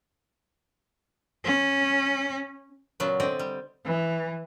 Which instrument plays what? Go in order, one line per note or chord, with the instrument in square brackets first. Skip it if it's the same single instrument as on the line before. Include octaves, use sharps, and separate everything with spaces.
[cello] C#4
[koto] A#2 C#3 F#3 B3
D3 C4 D5 D#5
G3
[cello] E3